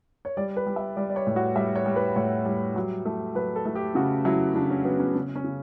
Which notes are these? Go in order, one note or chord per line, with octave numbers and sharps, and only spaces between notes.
C#5
G3 D5
B4
G3
E5
G3 D5
D5
C#5
A2
F#4
G3 E5
C#5
G3
B4
A2 C#5
G3
F#3
A3
F#3 B4
A4
A3
G4
C#3 F#4
F#3 E4
C#3 D4
C#4
F#3 B3
C#4
C#3 C#4
C#4
C#3